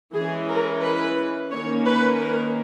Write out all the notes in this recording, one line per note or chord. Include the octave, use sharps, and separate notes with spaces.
E3 G#3 C#4 G#4
A#4
B4
D#3 A#3 C#4 C#5
B4
A#4